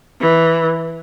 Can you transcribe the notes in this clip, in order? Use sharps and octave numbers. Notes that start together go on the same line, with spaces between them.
E3